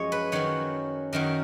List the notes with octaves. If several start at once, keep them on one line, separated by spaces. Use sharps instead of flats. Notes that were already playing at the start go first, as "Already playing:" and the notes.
Already playing: F#2 F3 G#3 C#5 D#5
B4
F#2 D#3 F#3 C#5
F#2 D#3 F#3 A#4